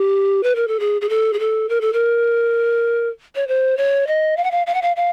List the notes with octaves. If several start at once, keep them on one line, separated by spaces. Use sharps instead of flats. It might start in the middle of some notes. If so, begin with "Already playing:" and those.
Already playing: G4
B4
A#4
A4
G#4
G#4
A4
G#4
A4
A#4
A4
A#4
C#5
C5
C#5
D#5
F5
F#5
F5
F5
F#5
F5
F5